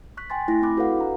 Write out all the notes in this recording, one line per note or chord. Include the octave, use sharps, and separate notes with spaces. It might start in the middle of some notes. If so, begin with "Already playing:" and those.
C#6 F#6 B6
G5 G#5 C6 A6
A3 E4 A#6
C4 E4 B5 D6 F#6
F#4 A4 B4 C#5 F5 F#5
D4 A#5